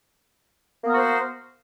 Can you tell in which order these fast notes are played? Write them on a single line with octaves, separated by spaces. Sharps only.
A#3 B3 A#4 F#4 C5